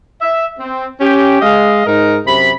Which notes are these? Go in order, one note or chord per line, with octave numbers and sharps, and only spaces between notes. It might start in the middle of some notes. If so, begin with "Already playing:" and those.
E5
C4
C#4 G4
G#3 D#5 F5
G#2 D#4 A#4
F#2 C3 B5